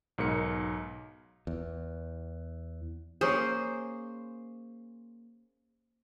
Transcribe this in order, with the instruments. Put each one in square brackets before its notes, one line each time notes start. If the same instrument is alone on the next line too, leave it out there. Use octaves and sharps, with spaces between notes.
[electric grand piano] B1 G#2 A#4 C#7
[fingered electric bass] E2
[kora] A#3 C#4 G#4 [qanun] C5